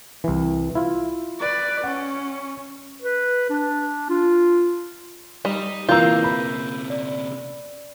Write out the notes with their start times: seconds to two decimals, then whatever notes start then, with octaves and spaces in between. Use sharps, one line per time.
0.24 C2 E3
0.75 E4 F4
1.39 B4 D5
1.84 C#4 F#5
3.02 B4
3.50 D4
4.10 F4
5.45 G3 D#4
5.89 C3 E3 A#3 C#4 F4 A#5 E6 G6
6.24 B5
6.90 D5